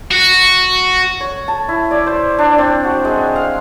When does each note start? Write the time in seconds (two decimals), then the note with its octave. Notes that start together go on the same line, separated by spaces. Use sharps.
0.11 F#4
1.21 C#5
1.48 A5
1.69 E4
1.91 D5
2.07 C5
2.38 D4
2.58 C4
2.84 F#4
3.05 G#3
3.36 F5